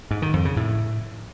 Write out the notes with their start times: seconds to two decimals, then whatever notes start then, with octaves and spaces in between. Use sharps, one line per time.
0.11 G#2
0.22 D#3
0.34 F2
0.45 C#3
0.57 A2